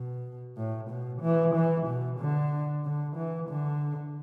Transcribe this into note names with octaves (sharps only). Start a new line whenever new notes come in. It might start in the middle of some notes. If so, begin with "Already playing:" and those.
Already playing: B2
A2
B2
E3
E3
B2
D3
D3
E3
D3